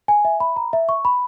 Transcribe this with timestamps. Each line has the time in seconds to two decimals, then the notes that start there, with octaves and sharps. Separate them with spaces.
0.08 G#5
0.25 E5
0.40 B5
0.56 A#5
0.73 E5
0.89 C#6
1.05 B5